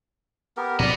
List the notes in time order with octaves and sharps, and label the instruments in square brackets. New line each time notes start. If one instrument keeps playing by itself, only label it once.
[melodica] B3 G4 A#4
[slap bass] B2 F3 F#3 [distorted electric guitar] B3 D#5 [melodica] D5